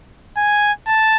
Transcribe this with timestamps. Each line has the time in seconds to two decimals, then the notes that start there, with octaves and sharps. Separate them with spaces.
0.37 G#5
0.87 A5